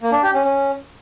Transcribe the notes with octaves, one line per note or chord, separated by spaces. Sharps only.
A#3
D4
G4
C#4
C#4